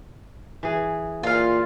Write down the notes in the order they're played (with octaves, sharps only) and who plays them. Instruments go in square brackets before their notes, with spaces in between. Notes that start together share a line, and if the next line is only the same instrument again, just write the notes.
[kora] E3 G#4
[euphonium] A#2 [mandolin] F4 F5